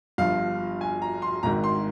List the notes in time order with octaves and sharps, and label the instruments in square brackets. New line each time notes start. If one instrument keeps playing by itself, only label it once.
[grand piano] G1 G2 F3 F5
G#5
A#5
C6
G#1 G#2 D#3 A#5
C6